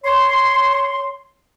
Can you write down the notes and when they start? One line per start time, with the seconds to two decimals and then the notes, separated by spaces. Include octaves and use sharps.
0.04 C#5 C6